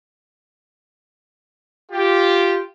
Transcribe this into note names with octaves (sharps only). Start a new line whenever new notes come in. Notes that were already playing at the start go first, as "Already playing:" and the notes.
F4 G4